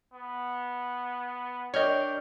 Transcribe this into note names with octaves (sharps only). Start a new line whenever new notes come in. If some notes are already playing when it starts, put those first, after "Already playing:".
B3
D4 G4 A#4 C#5 D#5 C#6 F6 G6